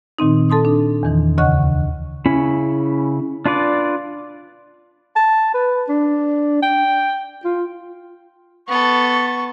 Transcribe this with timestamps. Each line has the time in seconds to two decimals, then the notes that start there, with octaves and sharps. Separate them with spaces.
0.19 A#2 D#3 C4 D#4
0.50 A4 A5 C6 D#6
0.65 D4
1.03 E2 D#3 E3
1.38 D2 C#3 D#5 F#5 C#6 F#6
2.26 C#3 C#4 E4 B5
3.46 D4 F4 B4 D5
5.16 A5
5.54 B4
5.89 D4
6.62 G5
7.44 F4
8.68 B3 A4 C#6